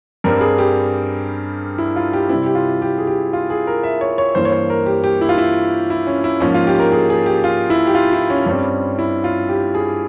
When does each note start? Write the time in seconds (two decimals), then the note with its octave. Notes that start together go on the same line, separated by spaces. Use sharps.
0.24 G2 G3 C4 A#4
0.41 G#4
0.58 G4
1.78 E4
1.96 F4
2.13 G4
2.29 C3 G3 C4 E4
2.46 G4
2.55 F4
2.82 G4
2.98 G#4
3.07 G4
3.33 F4
3.50 G#4
3.67 A#4
3.83 E5
4.01 C#5
4.18 C#5
4.35 G2 E3 A#3 C5
4.45 C#5
4.52 C5
4.70 A#4
4.86 G4
5.04 G4
5.21 E4
5.29 F4
5.38 E4
5.90 E4
6.07 C#4
6.24 E4
6.40 G#2 F3 A#3 C#4
6.54 F4
6.67 G4
6.79 A#4
6.92 G#4
7.10 G#4
7.26 G4
7.44 F4
7.70 E4
7.87 G4
7.95 F4
8.13 E4
8.30 C#4
8.46 G2 G3 C4 C#4
8.99 E4
9.24 F4
9.49 G4
9.75 G#4